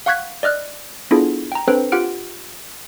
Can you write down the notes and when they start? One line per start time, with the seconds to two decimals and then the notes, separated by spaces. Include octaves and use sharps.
0.06 F5 F#5 C#6 F#6 G#6 B6
0.43 D5 D#5 F6 F#6
1.11 B3 D4 E4 F4 G#4 A4
1.52 G5 A#5
1.68 C4 D4 A4 B4 C5 G5
1.92 F4 G4 F#5 F6 D7